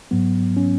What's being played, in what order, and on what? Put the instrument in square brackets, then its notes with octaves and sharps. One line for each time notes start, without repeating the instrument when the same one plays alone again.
[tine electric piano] G#2 F#3 B3
C#4